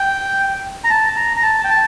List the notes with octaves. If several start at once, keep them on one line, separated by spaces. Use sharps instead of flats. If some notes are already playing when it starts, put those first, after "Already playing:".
Already playing: G5
A#5
A5
A#5
A#5
A5
G5
A5